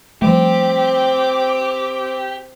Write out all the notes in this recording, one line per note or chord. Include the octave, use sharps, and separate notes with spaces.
F3 G3 A3 C4 G4 D6